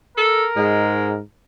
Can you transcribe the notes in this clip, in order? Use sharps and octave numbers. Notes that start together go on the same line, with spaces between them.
A4 A#4
G#2 G#3